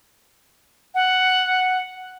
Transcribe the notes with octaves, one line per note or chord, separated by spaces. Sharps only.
F#5